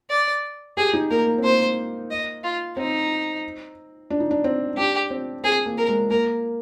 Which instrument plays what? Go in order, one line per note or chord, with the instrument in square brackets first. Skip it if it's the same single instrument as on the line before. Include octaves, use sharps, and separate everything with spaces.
[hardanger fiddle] D5
[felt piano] G4 [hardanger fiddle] G#4
[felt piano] D#4
[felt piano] A#3 [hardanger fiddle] A#4
[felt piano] A#3
C4
[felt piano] A#3 [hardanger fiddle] C5
[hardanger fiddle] D#5
F4
[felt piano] C4 [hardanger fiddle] D#4
[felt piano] D4
D#4
D4
C4
[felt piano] D4 [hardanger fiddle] G4
[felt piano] C4
[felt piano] C4 [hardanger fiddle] G#4
[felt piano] A#3
[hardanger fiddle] A#4
[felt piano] G#3
[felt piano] A#3 [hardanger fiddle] A#4